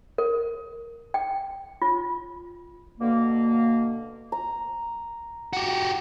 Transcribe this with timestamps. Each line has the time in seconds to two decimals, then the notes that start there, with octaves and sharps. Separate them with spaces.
0.18 A#4
1.14 G5
1.82 F4
3.00 B2 D3 A#3
4.32 A#5
5.53 F#4 G4